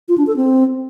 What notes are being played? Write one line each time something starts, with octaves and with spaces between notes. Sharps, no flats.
F4
D4
A4
C4